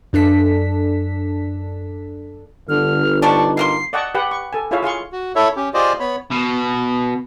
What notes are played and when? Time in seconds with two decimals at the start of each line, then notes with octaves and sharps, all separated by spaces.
0.13 F#2 D4 A4 B6
2.69 G1 D3 F6
3.22 F3 G3 D4 D#4 C#6
3.57 B2 A#3 C6 C7
3.93 D5 D#5 F#5 G5 A5 C#6
4.15 G4 B4 F#5 G5
4.31 C#6
4.53 A4 G#5
4.71 E4 F4 G#4 C#5 E5 F5
4.83 G#4 F5 C6 C#6
5.12 F#4
5.36 E4 A4 C#5 E5
5.56 C#4 G4
5.74 F4 G4 G#4 C5 D5 D#5
6.00 B3 C#5 B5
6.31 B2